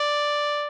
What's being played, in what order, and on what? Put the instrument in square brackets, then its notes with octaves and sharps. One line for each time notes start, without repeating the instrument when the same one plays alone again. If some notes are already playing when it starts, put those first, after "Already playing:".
Already playing: [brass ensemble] D5